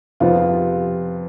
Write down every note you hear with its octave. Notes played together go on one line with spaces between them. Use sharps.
F2 C3 F3 B3 F4